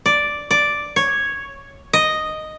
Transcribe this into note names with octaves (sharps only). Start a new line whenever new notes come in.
D5
D5
C#5
D#5